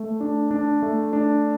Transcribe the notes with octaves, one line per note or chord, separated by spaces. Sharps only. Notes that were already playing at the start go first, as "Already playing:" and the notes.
Already playing: A3
D4
D4
A3
D4